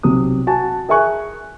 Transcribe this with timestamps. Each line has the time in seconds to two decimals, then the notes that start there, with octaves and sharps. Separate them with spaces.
0.03 B1 C3 D#6
0.47 F#4 G#5 A5
0.89 G#4 A#4 E5 G#5 C#6 F#6